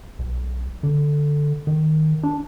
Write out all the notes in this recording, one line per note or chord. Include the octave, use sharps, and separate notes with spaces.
B1
D3
D#3
D4